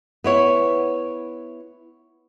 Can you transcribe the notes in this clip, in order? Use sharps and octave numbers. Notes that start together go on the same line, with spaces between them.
B3 E4 C#5